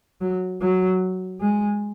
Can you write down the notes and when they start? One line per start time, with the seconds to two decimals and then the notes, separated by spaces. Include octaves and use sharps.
0.21 F#3
0.62 F#3
1.40 G#3